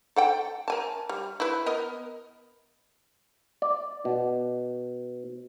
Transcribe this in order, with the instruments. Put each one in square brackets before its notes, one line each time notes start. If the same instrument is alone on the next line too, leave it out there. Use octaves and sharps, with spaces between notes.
[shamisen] A4 F#5 G5
A#4 G#5 A5
G3
E4 B4
B3 A#4 D#5
[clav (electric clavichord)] D5
B2